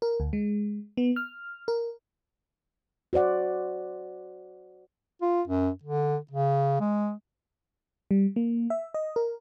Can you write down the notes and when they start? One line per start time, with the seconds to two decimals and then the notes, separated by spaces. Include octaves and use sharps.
0.02 A#4
0.20 D2
0.33 G#3
0.97 B3
1.16 F6
1.68 A#4
3.13 F#4 C5 D5 F#5
5.22 F4
5.47 F#2
5.83 D3
6.31 C#3
6.80 G#3
8.11 G3
8.36 A#3
8.70 E5
8.94 D#5
9.16 A#4